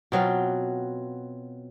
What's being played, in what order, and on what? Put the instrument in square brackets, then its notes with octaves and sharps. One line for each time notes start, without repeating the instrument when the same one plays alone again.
[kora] B2 F#3 C4 F4